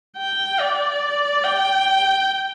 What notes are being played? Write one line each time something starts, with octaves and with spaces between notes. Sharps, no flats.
G5
D5
G5